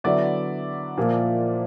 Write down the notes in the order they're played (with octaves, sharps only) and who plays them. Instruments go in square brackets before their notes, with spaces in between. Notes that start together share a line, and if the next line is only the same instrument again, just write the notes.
[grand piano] D3 F#3 B3 E4 D5 E5
A#2 F3 A#3